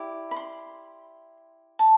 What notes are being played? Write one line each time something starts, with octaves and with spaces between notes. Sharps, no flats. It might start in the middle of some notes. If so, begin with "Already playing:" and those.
Already playing: E4 G4 D5
B5
C6
A5